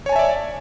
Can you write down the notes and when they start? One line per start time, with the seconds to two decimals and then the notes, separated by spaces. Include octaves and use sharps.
0.06 C#5
0.09 G#5
0.13 A5
0.16 E5
0.19 D5